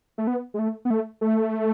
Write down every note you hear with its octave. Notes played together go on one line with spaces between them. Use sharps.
A3
B3
G#3
A3
B3
A3
A3